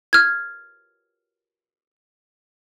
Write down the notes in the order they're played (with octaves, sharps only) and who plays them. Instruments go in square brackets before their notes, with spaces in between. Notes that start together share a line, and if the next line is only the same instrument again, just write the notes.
[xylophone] F6 G#6